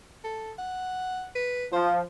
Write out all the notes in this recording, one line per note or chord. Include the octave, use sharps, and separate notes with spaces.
A4
F#5
B4
F3 C5